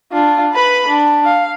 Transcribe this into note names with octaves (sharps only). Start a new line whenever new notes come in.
D4 F4
B4 B5
D4
F5